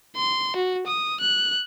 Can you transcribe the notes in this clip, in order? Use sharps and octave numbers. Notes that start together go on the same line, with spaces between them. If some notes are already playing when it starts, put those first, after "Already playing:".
C6
F#4
D#6
F#6